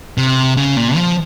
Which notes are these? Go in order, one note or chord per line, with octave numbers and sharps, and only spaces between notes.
C3
C#3
A#2
F3